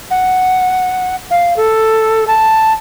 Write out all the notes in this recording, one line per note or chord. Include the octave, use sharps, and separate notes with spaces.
F#5
F5
A4
A5